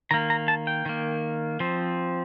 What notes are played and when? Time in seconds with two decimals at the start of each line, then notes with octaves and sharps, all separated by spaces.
0.11 D#3 A#3 A#5
0.30 A#5
0.48 A5
0.67 G5
0.86 D#3 A#3
1.60 F3 C4